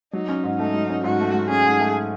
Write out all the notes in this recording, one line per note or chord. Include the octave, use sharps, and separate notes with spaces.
F#3 D#4
C#4
G#2
A3 D#4
F#3
C#4
G#2 F#4
A3
F#3
C#4 G#4
G#2
A3